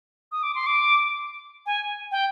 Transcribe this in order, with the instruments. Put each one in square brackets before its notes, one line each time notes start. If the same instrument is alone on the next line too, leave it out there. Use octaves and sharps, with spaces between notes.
[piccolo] D#6
D6
C6
D6
G#5
G5